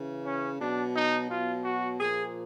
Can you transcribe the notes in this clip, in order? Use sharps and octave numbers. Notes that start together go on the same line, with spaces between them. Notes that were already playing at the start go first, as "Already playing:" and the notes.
Already playing: C#3 E3
C#4
B2 F#3 D4
D#4
B2 F#3 F4
F#4
A#2 F3 G#4